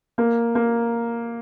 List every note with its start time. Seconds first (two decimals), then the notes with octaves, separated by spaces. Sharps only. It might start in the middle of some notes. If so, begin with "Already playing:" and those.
0.18 A#3
0.55 A#3